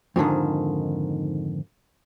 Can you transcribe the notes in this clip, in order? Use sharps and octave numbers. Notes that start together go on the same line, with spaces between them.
F2 G#2 D3 D#3